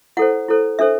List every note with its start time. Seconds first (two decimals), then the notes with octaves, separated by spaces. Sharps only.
0.17 E4 A4 C5 F#5
0.48 E4 A4 C5
0.79 D4 A4 C5 E5